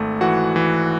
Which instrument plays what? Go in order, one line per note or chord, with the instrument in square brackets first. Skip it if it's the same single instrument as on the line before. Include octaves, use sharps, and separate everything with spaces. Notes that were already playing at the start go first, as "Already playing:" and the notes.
Already playing: [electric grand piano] G#1 A3
E3 F#4 F#5
E3